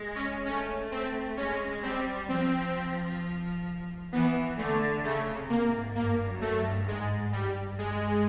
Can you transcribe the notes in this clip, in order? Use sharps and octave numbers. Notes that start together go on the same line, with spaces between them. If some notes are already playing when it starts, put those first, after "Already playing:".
Already playing: G#3
C#4
A3 C#4
C4
G#3 C#4
G3 C4
F3 C4
E3 B3
D3 A3
C#3 A3
C3
A#3
G#2
G2 A#3
F#2
A3
G2
G#2 G#3
G2 G3
G#3